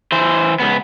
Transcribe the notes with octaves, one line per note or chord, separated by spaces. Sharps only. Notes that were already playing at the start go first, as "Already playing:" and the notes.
E3 C5
C#2 B3